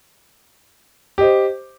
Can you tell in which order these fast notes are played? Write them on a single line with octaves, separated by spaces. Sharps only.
G4 D#5 C5